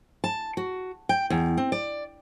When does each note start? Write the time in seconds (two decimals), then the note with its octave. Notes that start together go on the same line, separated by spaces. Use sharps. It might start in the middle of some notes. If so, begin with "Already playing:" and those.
0.24 A5
0.57 F#4
1.09 G5
1.30 E2
1.57 C4
1.72 D5